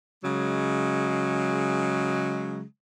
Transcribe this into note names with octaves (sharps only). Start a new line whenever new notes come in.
C#3 F#3 G#3